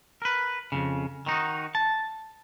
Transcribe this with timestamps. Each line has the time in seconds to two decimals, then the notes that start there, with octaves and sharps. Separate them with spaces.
0.22 A#4 B4
0.72 F2 A2 C#3
1.26 D#3 D#4 F#4
1.75 A5